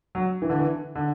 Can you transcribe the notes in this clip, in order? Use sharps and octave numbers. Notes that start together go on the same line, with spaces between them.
F#3
E3
D3
E3
D3